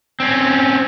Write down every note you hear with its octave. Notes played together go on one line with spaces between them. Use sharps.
C4 C#4